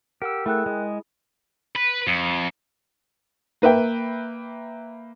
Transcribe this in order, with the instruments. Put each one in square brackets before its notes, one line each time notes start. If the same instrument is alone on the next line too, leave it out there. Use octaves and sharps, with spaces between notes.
[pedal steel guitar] G4 [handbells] A#4 F#5 E6
[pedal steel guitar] A3 [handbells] E4 G#4 [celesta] A#4 G5 F#6
[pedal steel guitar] G#3
[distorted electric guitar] B4
F2
[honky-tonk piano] A#3 B4 E5 G5